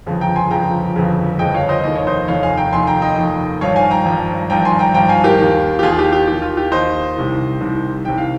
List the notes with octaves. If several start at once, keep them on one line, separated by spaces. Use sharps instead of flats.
G1 F2 C#3 F3
G5 A#5
G#5 C6
G1 F2 C#3 F3 G5 A#5
G1 F2 C#3 F3
G1 F2 C#3 F3 D#5 G5
C#5 F5
C5 D#5
F1 D#2 D#3 D#5
C#5
C5 D#5
F1 D#2 D#3 C#5 F5
F5 G#5
G5 A#5
F1 D#2 D#3 G#5 C6
G5 A#5
D#5 G5
F1 D#2 D#3
G#1 G2 F3 C#5 F5
F5 G#5
G5 A#5
G#1 G2 F3
G#1 G2 F3 G5 A#5
G#5 C6
G5 A#5
G#1 G2 F3 G5 A#5
F5 G#5
G4 A#4
D#2 D#3
G4
D#2 D#3 F4 G#4
G4
G4
D#2 D#3 G4
F4
G4
D#2 D#3 C5 D#5
C2 C3 D#3
C2 C3 D#3
C2 C3 D#3 G5
F5